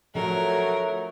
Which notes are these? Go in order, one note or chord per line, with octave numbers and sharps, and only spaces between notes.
F3 F#3 A3 D4 A#4